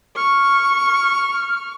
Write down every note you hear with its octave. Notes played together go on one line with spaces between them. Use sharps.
C#6 F6